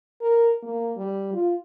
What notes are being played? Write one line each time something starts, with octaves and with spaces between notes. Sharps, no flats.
A#4
A#3
G3
F4